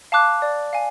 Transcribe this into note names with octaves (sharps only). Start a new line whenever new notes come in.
F5 A5 D6 F#6
D5
F5 G#5